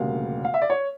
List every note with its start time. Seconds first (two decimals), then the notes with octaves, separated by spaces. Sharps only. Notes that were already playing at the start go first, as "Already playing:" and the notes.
Already playing: E1 D2 C#3 G3 A#3 F5
0.45 F5
0.54 E5
0.62 D5
0.70 C#5